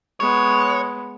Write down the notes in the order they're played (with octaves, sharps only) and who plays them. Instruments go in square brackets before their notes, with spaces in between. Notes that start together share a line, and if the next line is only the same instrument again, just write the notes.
[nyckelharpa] G#3 B3 [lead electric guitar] C#5